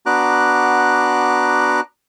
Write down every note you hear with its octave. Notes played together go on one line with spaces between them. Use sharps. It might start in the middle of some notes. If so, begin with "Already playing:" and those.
B3 D4 F#4 A#5 D6 F#6